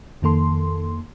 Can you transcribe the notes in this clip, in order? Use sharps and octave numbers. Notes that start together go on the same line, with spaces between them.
F2 D#3 A#3 A4 C6